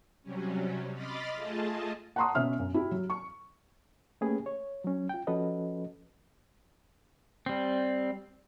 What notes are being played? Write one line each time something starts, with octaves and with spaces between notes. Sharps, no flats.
C3 F#3 G3 C#4
D#5 B5 C6 D6 F6 A6
A3 F4 G#4 D#5 A5
F#5 A5 A#5 C6 C#6 D#6
B2 C#4 E5 F6
F#2
E4 F#4 G4
F#3
C#6
A3 A#3 C#4 G4 G#4 B4
C#5
F#3 C#4
F4 G5
F3 C#4 F#4 A4 B4 D#5
G3 C4